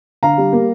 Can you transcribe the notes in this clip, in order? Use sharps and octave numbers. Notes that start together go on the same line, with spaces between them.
D3 F5 A#5
G3
A#3